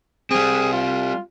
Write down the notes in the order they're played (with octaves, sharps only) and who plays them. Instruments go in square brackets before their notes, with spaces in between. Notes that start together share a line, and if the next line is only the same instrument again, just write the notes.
[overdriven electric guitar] G3 C4 [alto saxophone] G#4
[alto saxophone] F4